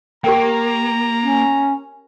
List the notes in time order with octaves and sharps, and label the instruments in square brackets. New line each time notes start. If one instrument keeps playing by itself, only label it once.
[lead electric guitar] A#3 [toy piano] G4 A#4 G5 [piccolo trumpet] A#5
[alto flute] C#4